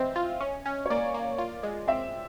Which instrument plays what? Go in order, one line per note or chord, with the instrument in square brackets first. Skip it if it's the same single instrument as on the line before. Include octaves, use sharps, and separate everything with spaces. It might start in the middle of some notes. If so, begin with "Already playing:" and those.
Already playing: [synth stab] E3 C4 [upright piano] D#5 E5
[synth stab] F4
C#4
C#4
[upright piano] C#5
[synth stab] A#3 [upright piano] D5
[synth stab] A#3
F4
G#3
[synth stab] C4 [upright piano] E5